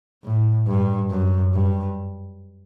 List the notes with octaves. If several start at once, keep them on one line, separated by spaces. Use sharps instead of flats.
A2
G2
F#2
G2